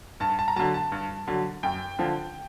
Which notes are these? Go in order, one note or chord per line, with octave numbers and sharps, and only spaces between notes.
G2 A5
A5
A#5
D3 F#3 A5
A5
G2
D3 F#3
F#2 G5
D3 F3